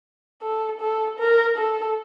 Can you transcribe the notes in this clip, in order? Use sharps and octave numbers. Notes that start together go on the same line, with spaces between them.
A4
A4
A#4
A4